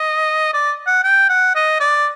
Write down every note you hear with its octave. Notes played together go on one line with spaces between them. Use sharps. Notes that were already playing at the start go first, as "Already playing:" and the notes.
Already playing: D#5
D5
F#5
G5
F#5
D#5
D5